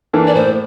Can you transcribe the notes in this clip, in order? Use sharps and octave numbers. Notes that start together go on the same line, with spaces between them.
E3 A#3 D4 A4
D5
A2 C5